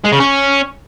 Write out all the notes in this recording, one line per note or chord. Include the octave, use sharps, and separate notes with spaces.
G#3
C#3
C#4